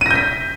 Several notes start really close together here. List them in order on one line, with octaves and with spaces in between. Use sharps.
D#7 A#6 G6 B6